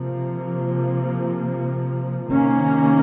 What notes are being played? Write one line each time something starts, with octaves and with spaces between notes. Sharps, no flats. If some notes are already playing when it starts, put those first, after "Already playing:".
Already playing: C3 F3 A#3
C3 D#3 A#3 C#4